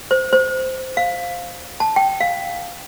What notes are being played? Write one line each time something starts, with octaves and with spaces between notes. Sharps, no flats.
C5
C5
F5
A5
G5
F5